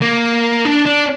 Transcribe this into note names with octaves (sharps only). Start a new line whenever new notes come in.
A#3
D4
D4